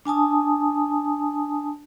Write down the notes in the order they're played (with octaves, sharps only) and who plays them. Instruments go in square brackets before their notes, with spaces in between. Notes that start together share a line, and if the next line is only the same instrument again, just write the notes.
[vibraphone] D4 G#5 A5 D#6